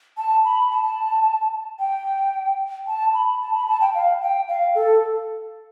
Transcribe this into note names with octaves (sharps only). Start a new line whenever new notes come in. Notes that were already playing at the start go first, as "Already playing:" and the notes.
A5
B5
A5
G5
A5
B5
A5
B5
A5
G5
F5
G5
F5
A4